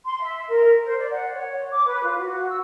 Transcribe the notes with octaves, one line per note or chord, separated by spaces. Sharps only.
C6
E5
A#4
C5
D5
F#5
C#5
D6
B4
F4
F#4
E6